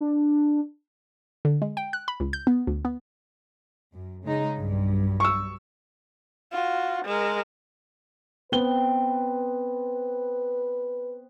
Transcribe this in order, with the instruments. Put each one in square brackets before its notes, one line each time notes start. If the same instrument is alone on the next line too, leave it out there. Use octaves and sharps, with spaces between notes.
[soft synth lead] D4
[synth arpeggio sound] D3
G#3
G5
F#6
B5
C#2
G6
B3
D2
B3
[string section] F#2
C#3 G#3 D#4
B1 G2
[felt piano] C#6 E6
[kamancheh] F4 F#4
G#3 A#4
[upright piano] B3 G7 [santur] C4 [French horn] B4